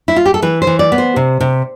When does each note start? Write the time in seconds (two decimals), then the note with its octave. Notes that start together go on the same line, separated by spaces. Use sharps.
0.08 E4
0.16 F4
0.26 G4
0.34 A4
0.42 E3 B4
0.62 C5
0.67 E3
0.79 D5
0.92 B3
0.98 C5
1.16 C3
1.40 C3